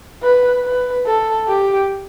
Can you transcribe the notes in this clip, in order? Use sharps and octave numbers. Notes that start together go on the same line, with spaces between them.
B4
B4
A4
G4